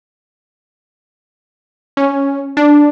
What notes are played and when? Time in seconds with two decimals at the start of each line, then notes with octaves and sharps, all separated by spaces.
1.97 C#4
2.57 D4